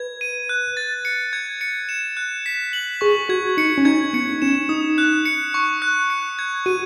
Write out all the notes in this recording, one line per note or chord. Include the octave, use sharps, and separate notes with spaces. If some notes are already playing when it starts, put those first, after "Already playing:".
Already playing: B4 G#6
D#7
F#6
A6
C#7
G#6
C#7
E7
F#6
B6
F#7
G#4 C#6
F#4 G#6
D#4 C#7
C#4
D#4 G#6
B3 C#7
D#4
C#4 E7
D#4 D#6
F#6
C#7
C#6
F#6
C#7
G#6
F#4 D#7